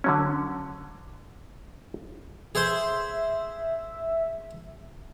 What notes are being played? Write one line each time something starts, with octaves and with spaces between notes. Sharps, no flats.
D3 F#3 C#4
G#4 C5 E5